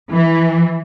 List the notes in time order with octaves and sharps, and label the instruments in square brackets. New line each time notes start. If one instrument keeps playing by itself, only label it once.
[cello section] E3